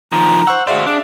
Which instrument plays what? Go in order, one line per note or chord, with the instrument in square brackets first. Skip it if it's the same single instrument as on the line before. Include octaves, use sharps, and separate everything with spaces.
[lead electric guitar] D#3 F3 [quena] A#5
[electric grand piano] C5 C#6 E6 [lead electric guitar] F#5
[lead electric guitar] F#4 C5 [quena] G#4 [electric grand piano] D5 E5 F5
[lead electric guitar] D4 [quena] G#4